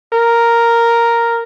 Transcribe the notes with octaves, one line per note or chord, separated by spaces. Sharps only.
A#4